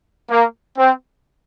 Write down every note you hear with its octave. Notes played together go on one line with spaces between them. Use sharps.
A#3
C4